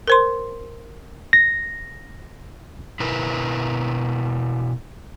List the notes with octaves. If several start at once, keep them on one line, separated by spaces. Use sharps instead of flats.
A#4 C5 C6
A#6
B2 E4 A#4 B4